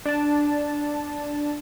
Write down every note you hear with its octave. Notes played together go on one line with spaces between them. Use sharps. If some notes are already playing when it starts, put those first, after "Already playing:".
D4 A5